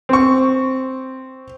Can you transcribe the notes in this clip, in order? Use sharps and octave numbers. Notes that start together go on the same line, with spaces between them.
C4 C#6